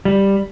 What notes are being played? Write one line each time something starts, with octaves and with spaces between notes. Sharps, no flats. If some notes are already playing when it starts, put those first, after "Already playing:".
G3